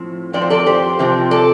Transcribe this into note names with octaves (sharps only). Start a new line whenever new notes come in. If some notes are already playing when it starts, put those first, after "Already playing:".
Already playing: A2 F3 C4
F2 F3 C4 D5
C5
A4 D5
G4 C5
C3 F3 C4
A4 D5